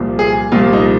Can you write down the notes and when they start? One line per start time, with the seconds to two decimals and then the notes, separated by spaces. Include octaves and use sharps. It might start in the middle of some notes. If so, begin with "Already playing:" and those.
Already playing: C2 A#2 F3
0.19 G#4
0.52 C2 A#2 F3 F4
0.73 D#4